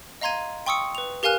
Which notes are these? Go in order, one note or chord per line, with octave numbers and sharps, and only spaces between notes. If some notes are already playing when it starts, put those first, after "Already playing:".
D#5 F5 A#5 C6 G#6 D#7
G5 C6 C#6 D#6 E6 C#7
B4 F7
G4 A#4 F5 G#5 F6 F#6